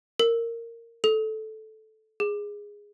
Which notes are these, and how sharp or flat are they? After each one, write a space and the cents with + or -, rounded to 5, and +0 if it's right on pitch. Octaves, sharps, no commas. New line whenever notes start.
A#4 -15
A4 -10
G#4 -10